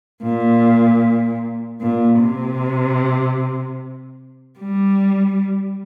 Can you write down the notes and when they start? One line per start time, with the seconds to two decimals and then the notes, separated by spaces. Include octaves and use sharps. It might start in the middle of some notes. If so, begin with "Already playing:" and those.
0.22 A#2
1.81 A#2
2.20 C3
4.60 G3